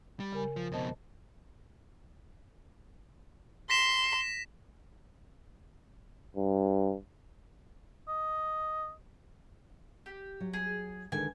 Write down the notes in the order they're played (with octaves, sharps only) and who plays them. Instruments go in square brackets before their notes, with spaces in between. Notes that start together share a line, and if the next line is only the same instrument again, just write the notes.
[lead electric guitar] G3
[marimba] C#3 A#4 G#5
[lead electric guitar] F3
[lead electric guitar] F2 B2 [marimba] C5 D#5 A5
[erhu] C6 [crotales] A#6 B6 E7
[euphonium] G2
[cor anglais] D#5
[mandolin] G4
[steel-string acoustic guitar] F#3
[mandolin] G#4
[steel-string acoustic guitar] D3 D#3 G#3 [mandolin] G#5